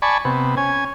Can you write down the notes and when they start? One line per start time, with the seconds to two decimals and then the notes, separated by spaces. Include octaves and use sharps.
0.02 D5 G#5 A5 B5 C#6
0.25 C3 B3
0.57 C#4 G#5